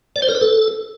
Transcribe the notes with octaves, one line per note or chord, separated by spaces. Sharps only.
D5
C5
A#4
B4
A4